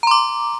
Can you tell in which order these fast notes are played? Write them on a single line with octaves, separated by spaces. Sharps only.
A#5 C6 D6